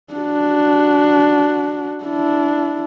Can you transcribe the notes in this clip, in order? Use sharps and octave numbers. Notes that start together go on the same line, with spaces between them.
D4 F#4
D4 E4